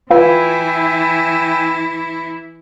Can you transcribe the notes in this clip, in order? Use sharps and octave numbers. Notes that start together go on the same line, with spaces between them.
E3 E4 F4 B4 E5 G5 G#5